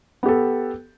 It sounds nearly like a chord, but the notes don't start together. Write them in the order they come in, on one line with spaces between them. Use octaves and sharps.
B3 G4 A4